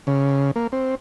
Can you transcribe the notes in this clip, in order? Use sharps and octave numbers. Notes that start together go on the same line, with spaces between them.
C#3
A#3
C4